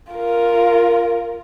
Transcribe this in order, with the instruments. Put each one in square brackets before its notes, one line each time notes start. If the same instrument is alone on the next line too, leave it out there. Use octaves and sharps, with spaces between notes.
[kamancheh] F4 A#4